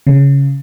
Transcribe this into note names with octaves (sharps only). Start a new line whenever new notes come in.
C#3